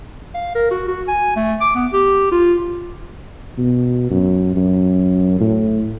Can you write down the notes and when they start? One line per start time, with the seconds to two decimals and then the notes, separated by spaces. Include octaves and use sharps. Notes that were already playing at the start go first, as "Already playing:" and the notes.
0.34 F5
0.55 A#4
0.71 F#4
0.88 F#4
1.08 G#5
1.36 A3
1.60 D6
1.75 B3
1.93 G4
2.32 F4
3.59 B2
4.11 F#2
4.56 F#2
5.41 A2